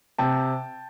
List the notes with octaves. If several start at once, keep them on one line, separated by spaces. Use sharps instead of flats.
C3 G5 A5